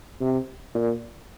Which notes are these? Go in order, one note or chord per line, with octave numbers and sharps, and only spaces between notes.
C3
A#2